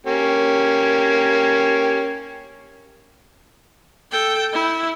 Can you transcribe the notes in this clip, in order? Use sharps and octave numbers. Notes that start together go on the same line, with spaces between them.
A#3 C#4 G4
A4 G5
E4